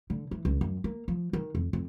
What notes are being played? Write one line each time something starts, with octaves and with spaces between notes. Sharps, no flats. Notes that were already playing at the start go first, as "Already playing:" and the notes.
D3
E3
C#2
F#2
A#3
F3
D#3
F2
F2